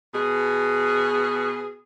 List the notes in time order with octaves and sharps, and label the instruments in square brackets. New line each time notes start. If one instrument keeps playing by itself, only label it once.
[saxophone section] B2 G#4